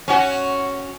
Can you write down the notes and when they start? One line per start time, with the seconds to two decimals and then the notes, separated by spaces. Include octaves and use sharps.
0.08 C#4 F#4